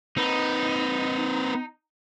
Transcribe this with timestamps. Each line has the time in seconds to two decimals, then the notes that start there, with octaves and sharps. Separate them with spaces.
0.17 C4 D#4 B4